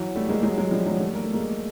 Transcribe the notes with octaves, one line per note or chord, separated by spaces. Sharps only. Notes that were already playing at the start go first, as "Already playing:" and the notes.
Already playing: E3 F#3
G3 A3
G#3 A#3
F#3 G#3
F#3 G#3
F3 G3
F#3 G#3
G3 A3
A#3
A3
G#3 A#3